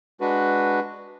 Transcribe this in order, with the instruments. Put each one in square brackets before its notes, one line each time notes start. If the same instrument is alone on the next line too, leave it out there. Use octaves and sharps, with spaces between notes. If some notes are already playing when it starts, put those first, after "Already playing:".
[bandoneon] G#3 D4 F#4 B4